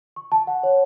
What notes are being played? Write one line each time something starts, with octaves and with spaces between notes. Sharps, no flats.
C#6
A5
F#5
C#5